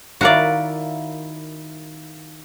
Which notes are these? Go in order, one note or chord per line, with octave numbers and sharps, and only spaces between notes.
D#3 E4 F#4 A#4 D5 F5